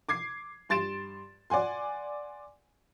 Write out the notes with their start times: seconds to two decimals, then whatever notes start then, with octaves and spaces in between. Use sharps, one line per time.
0.09 D6 G#6 C7
0.69 G2 C6 A6 D7 E7
1.50 D5 F#5 G#5 C6